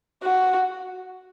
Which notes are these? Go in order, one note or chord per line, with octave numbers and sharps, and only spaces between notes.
F#4